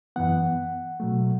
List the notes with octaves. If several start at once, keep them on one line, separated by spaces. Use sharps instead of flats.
F#2 E3 B3 F#5
B2 F#3 A3